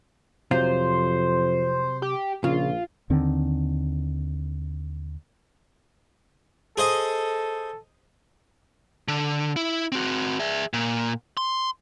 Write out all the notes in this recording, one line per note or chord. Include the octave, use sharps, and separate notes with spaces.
F2 C3 F#3 F4 C5
G4
A#1 C#3 F4
D#2 D3 D#3 C4
G#4 A4 C5 D#5
D3
E4
C4 F#4
G#4 E5
A#2
C6